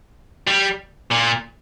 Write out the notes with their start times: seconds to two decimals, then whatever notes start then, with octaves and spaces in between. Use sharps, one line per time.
0.47 G3
1.11 A#2